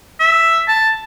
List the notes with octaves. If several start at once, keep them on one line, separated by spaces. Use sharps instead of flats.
E5
A5